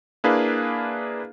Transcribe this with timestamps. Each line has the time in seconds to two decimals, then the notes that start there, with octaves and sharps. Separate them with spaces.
0.24 A#3 D4 E4 G#4 B4 F5